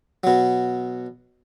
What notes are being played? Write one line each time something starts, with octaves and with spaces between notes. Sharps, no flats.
B2 F#3